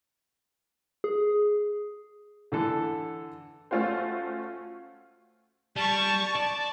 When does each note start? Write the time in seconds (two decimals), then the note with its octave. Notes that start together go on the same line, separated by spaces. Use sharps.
1.04 G#4
2.52 D3 E3 A4
3.71 A3 C#4 F4 F#4 C5
5.76 G3 A5 C#6
6.36 D5 A5